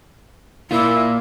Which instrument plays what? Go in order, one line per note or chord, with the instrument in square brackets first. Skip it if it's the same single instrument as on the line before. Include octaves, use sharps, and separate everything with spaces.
[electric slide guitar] A#3 F4 [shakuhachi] E4